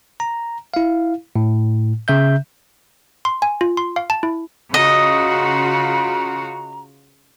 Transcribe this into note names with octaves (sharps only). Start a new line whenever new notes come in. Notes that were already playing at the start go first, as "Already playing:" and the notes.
A#5
E4 F5
A2
C#3 E5 G6
C6
G#5
F4
C6
F5
A5
E4
C#3 F4 F#4 D#5 A#5